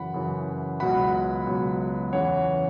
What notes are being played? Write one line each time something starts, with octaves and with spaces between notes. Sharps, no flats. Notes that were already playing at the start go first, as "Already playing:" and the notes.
Already playing: F#2 C#3 E3 F#5 B5
F#2 C#3 E3
C#2 B2 F#3 F#5 B5
C#2 B2 F#3
E2 C#3 E3 C#5 F#5